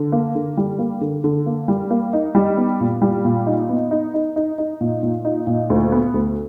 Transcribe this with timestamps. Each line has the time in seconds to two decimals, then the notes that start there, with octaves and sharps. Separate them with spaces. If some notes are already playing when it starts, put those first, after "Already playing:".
Already playing: D3
0.12 A#3
0.35 D3
0.57 G3
0.79 A#3
1.01 D3
1.24 D3
1.46 A#3
1.68 G3
1.90 A#3
2.13 D#4
2.35 G3
2.57 B3
2.80 A#2
3.02 G3
3.25 A#2
3.47 D#4
3.69 B3
3.91 D#4
4.14 D#4
4.36 D#4
4.58 D#4
4.81 A#2
5.03 A#2
5.25 D#4
5.47 A#2
5.70 D2
5.92 B3
6.14 D2